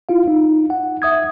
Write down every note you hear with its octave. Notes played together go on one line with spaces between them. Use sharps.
E4 F4 F5
D#4
F#5
E5 D#6 G#6